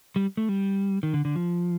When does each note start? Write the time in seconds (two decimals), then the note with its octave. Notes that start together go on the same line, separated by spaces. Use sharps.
0.16 G3
0.37 A3
0.49 G3
1.03 D#3
1.14 D3
1.25 D3
1.36 F3